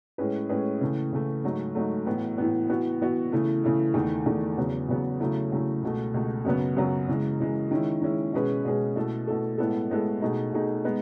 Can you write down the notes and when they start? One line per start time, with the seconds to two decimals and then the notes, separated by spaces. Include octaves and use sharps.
0.18 A2 G#3 C#4 G#4 B4
0.49 A2 G#3 C#4 G#4 B4
0.81 C#3 E3 A3
1.13 C#3 E3 A3
1.44 G#2 F#3 A3
1.75 G#2 F#3 A3
2.06 A2 E3 B3
2.38 A2 E3 B3
2.70 E3 B3 F#4
3.01 E3 B3 F#4
3.32 C#3 E3 A3 E4
3.64 C#3 E3 A3 E4
3.94 E2 D#3 A3
4.26 E2 D#3 A3
4.58 E2 C#3 F#3 B3
4.89 E2 C#3 F#3 B3
5.20 C#3 F#3 A3 E4
5.52 C#3 F#3 A3 E4
5.83 C#2 B2 A3
6.14 C#2 B2 A3
6.45 F#2 C#3 F#3 B3
6.77 F#2 C#3 F#3 B3
7.08 C#3 E3 G#3
7.40 C#3 E3 G#3
7.71 D#3 G#3 C#4 E4
8.02 D#3 G#3 C#4 E4
8.33 B2 G#3 C#4 G#4 B4
8.65 B2 G#3 C#4 G#4 B4
8.96 B2 A3 E4 A4
9.27 B2 A3 E4 A4
9.58 A2 G#3 B3 E4 A4
9.90 A2 G#3 B3 E4 A4
10.22 B2 A3 D#4 G#4
10.52 B2 A3 D#4 G#4
10.84 G#3 B3 D#4